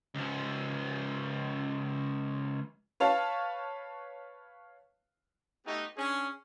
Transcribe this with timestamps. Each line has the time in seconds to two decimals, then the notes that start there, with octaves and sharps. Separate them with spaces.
0.15 C#2 F3
3.00 B4 C#5 F5 A5
5.66 A3 B3 D#4 F#4 G4
5.97 C#4 D4 G#4